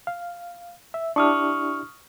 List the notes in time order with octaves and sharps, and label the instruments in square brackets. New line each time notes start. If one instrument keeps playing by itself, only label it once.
[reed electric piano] F5
E5
[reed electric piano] D4 E4 G4 [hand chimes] C#6 D#6 F6